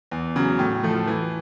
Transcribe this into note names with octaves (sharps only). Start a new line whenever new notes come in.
E2
C#3 F#3
A2
F3 A3
E3